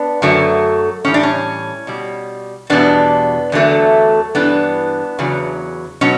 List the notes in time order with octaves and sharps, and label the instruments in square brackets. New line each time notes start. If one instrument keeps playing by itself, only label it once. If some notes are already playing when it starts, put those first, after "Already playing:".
Already playing: [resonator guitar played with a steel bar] B3 D4
F#2 D3 F#3 A3
A2 E3 G3 C#4
D4
C#4
B2 G3
E2 B2 G3 B3 D4
E2 D3 F#3 A3
G2 E3 G3 B3 D4
E2 C#3 F#3
B2 F#3 C#4